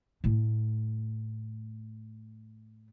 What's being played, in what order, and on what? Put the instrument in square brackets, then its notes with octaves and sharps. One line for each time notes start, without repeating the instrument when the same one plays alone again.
[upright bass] A2 A3